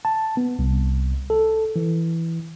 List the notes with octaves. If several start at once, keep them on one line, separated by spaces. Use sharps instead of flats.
A5
B3
C2
A4
E3